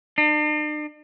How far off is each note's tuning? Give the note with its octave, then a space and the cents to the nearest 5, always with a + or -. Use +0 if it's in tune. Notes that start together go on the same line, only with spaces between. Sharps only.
D4 +45